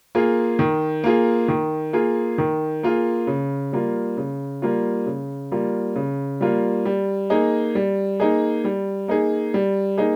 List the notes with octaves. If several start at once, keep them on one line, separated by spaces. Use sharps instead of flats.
A#3 F4 G#4
D#3
A#3 F4 G#4
D#3
A#3 F4 G#4
D#3
A#3 F4 G#4
C#3
G3 A#3 F4
C#3
G3 A#3 F4
C#3
G3 A#3 F4
C#3
G3 A#3 F4
G3
A#3 D#4 G#4
G3
A#3 D#4 G#4
G3
A#3 D#4 G#4
G3
A#3 D#4 G#4